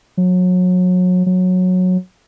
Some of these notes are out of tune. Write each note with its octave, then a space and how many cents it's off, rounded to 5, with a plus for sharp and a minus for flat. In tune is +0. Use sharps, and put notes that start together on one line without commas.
F#3 -30
F#3 -15